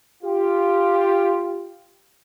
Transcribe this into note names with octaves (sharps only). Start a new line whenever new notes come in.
F4 G4